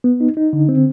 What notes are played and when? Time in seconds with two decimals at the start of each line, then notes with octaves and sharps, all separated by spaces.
0.04 B3
0.21 D#4
0.37 D#4
0.53 D3
0.69 C4